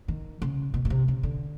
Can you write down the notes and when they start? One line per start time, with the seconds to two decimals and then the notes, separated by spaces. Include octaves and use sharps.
0.08 D#3
0.42 C#3
0.74 B2
0.85 B2
0.90 C3
1.08 C#3
1.23 D3